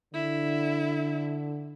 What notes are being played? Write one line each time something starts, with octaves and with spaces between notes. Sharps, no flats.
D3 E4